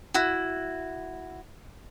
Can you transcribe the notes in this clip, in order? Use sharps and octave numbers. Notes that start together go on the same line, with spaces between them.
E4 F#4